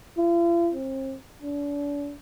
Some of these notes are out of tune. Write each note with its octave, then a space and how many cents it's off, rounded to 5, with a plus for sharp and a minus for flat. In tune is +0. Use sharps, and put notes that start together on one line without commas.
F4 -45
C4 +35
D4 -40